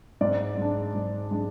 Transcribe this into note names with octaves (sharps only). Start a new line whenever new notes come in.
G#2 D5
G#3 D4
G#2
G#3 D4